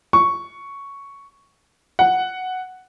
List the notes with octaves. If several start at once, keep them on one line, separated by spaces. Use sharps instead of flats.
C#6
F#5